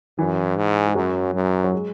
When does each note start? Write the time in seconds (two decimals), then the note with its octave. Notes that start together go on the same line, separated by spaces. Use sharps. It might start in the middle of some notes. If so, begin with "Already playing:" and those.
0.18 F#2 E3
0.57 G#2
0.87 G#3
0.95 F#2 F#3
1.34 F#2
1.64 F#3
1.73 G#3